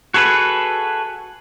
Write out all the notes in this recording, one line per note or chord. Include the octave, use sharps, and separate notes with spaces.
F#4 G#4 A4 B4